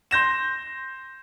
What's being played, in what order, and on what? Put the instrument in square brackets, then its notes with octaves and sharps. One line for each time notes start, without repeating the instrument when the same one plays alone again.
[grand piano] C6 G6 A#6 E7